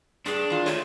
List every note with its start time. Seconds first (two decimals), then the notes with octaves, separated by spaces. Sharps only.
0.26 G2 D4 G#4
0.50 D#3 F4
0.66 A3 F4 C#5